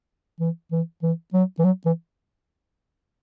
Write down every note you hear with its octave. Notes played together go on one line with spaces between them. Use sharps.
E3
E3
E3
F#3
E3
F#3
E3